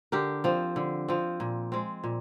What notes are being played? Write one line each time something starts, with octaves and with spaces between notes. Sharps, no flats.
D3 G4 A#4
F3 C4
D3
F3 C4
A#2
G#3 C4
A#2